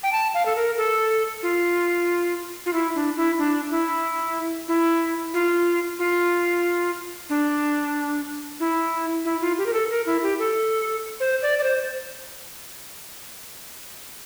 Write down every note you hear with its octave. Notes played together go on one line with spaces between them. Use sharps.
G5
A5
F5
A4
A#4
A4
F4
F4
E4
D4
E4
D4
E4
E4
F4
F4
D4
E4
E4
F4
G4
A#4
A4
A#4
E4
G4
A4
C5
D5
D5
C5